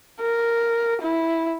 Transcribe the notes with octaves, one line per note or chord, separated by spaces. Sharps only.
A#4
E4